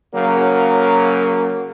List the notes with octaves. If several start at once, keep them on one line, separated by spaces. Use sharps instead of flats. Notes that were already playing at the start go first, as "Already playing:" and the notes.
C#3 F#3 A#3